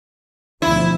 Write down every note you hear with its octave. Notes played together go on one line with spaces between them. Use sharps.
D2 B2 F3 E4